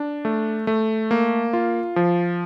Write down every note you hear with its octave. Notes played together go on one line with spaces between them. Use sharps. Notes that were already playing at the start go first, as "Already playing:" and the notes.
Already playing: D4
A3
A3
A#3
F4
F3